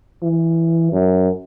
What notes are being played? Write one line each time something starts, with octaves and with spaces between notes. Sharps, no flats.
E3
F#2